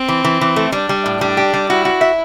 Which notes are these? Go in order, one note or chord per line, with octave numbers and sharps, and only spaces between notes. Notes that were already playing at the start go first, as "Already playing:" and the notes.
Already playing: C4
E3
E3
E3
A3
G3 D4
G3
A2
G3 D4
G4
G3
E4 F#4
F#4
E5